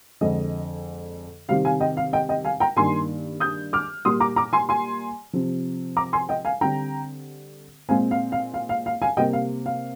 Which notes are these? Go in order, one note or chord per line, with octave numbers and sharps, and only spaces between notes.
F2 D3 G#3 D#5
C3 D#3 G3 C4 F5
F5 G#5
D#5 G5
F5
D#5 G5
D#5 G5
F5 G#5
G5 A#5
G2 D#3 A#3 G#5 C6
D#6 G6
D6 F6
A#2 G3 A#3 C6 D#6
A#5 D6
A#5 D6
G#5 C6
G#5 C6
C3 F3 C4
A#5 D6
G#5 C6
D#5 G5
F5 G#5
D3 G3 C4 G5 A#5
A#2 G#3 C4 F5 G#5
F5
F5
F5
F5
F5
F5 G#5
C3 G3 A#3 D#5 G5
F5
F5